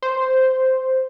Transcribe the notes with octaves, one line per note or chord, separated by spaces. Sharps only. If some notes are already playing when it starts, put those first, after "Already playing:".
C5